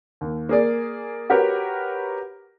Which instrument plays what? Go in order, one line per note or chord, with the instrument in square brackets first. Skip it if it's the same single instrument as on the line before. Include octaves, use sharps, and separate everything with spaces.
[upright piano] D#2
A#3 G#4 D5
F#4 G4 A#4 B4 C#5